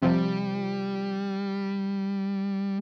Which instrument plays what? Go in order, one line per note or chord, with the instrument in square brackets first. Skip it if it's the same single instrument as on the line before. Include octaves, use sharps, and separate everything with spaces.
[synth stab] C3 F3 [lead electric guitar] G3